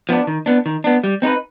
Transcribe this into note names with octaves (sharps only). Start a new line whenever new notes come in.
F3 B3 D4
D#3
B3 D4
D#3
B3 D4
G3
C4 D#4 G4 B4